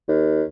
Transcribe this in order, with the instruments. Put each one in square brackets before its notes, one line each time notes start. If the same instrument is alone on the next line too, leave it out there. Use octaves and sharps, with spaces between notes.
[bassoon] D#2